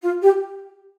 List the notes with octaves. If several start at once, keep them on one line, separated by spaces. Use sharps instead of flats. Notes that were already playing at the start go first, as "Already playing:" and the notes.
F4
G4